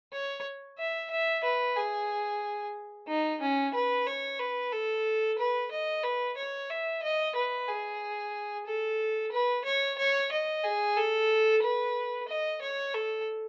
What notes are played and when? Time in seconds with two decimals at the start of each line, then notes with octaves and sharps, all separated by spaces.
0.13 C#5
0.78 E5
1.10 E5
1.44 B4
1.76 G#4
3.08 D#4
3.41 C#4
3.74 B4
4.07 C#5
4.39 B4
4.72 A4
5.38 B4
5.71 D#5
6.03 B4
6.37 C#5
6.70 E5
7.03 D#5
7.35 B4
7.68 G#4
8.66 A4
9.32 B4
9.65 C#5
9.98 C#5
10.32 D#5
10.64 G#4
10.97 A4
11.63 B4
12.29 D#5
12.62 C#5
12.94 A4